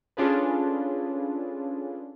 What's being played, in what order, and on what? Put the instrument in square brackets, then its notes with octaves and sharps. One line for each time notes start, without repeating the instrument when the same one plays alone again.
[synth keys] C#4 D4 F4 G#4 A4 B4